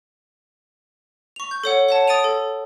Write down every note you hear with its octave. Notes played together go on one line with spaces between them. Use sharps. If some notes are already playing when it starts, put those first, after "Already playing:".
C#6 F7
G6
A4 C#5 F#5
C#5 F#5 A5
D#6 A6 D7 D#7 F7
A4